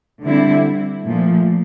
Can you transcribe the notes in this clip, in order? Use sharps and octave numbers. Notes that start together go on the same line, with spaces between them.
D3 G3 C4 E4
A#2 F3 A3